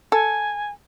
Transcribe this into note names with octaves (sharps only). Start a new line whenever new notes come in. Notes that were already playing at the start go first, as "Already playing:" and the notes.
A4 G#5